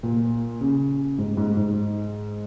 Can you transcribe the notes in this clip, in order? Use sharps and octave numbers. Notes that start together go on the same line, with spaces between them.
A#2
C#3
G#2
G#2
G#2